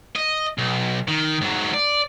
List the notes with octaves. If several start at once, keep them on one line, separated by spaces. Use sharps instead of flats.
D#5
B1
D#3
G#2 F#3
D5